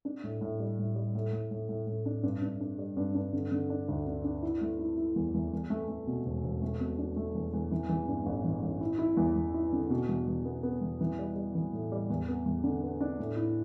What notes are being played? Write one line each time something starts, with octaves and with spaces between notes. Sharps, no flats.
D4
A2
A2
G3
A2
G3
A2
A2
A2
A2
A2
D4
G2
G2
D4
G3
G2
G2
D3
D3
D4
D2
D4
D4
E4
A3
E4
E4
E2
E2
E2
A3
A3
B2
E1
E1
A3
B2
D4
A3
E2
E2
E3
E3
G2
A1
E3
A1
E4
E4
E2
E2
E4
D3
B2
E2
E2
B3
B3
E2
E3
G3
G3
E3
A2
G3
E2
B3
E2
D3
B3
D4
A2
E4